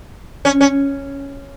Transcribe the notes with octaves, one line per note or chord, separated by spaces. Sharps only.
C#4
C#4